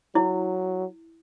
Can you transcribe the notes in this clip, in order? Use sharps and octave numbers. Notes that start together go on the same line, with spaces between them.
F#3 E4